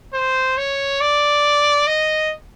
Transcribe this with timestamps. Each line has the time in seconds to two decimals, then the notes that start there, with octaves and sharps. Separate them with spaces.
0.14 C5
0.57 C#5
1.01 D5
1.87 D#5